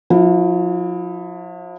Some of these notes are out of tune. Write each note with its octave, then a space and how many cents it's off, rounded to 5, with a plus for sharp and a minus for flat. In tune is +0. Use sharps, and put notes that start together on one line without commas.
F3 +40 E4 +0